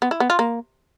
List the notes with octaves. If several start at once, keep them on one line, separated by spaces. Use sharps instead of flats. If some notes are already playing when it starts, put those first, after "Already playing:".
B3
E4
B3
F4
A#3